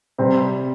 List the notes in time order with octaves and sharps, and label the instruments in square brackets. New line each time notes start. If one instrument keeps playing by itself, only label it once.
[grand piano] C3 G3 C4